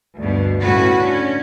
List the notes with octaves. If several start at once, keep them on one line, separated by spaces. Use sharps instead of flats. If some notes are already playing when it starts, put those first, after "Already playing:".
D2 G2 B2
A2 C#4 F#4 B4
D3 C#4